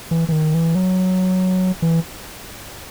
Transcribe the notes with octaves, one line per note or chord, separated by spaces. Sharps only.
E3
E3
D#3
E3
F#3
E3